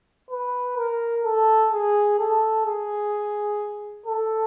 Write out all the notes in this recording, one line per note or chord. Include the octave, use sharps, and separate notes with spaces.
B4
A#4
A4
G#4
A4
G#4
A4